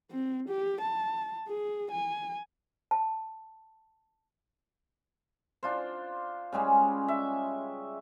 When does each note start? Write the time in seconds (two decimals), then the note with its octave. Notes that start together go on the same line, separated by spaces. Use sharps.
0.11 C4
0.48 G4
0.81 A5
1.48 G#4
1.91 G#5
2.91 A5
5.63 D4 F4 C5
6.52 C#3 G3 G#3 C#4
7.08 E5